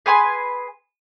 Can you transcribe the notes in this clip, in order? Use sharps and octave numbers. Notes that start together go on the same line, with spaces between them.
G#4 B4 G#5 C6